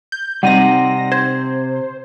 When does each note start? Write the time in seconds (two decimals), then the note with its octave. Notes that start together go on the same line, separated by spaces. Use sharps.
0.12 G6
0.43 C3 G3 C4 D#4 F#5 A#6 D#7
1.12 C5 G#6